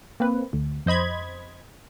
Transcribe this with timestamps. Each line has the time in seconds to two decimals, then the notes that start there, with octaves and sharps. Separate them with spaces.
0.20 A#3 C4 B4
0.53 D2
0.86 F2 C5 D#5 B5 G#6